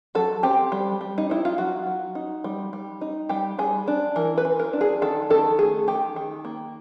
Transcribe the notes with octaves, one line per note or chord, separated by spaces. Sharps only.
F#3 A4
C4 G4
G3
G3
D#4
D#4 E4
F4
F#3 F#4
F#3
D#4
G3
G3
D#4
G3 G4
G3 G#4
D4
E3 A#4
B4
E3
A#4
D4
G#4
D#3 A4
D#3 A4
A3 G#4
D#3 G4
D#3
A#3